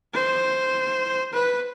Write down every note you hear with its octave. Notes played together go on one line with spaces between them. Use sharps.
C5
B4